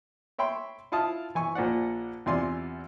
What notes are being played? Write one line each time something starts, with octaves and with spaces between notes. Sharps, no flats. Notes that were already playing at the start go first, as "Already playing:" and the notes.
C#5 E5 G5 B5 C6
E4 F4 F5 A5 D#6
E3 G#5 C#6
A#1 A#2 C5 D5 F#5
E2 C3 F4 D5 G#5 C6